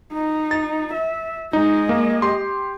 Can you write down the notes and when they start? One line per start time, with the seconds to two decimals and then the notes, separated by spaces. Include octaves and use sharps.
0.13 D#4
0.51 A6
0.93 E5
1.53 G#3 D#4 D#5
1.89 A#3
2.22 G4 C6